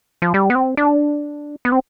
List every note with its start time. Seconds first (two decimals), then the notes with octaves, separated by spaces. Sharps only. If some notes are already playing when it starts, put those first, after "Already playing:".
0.22 F3
0.34 G3
0.50 B3
0.55 C4
0.77 D4
1.65 B3
1.72 C4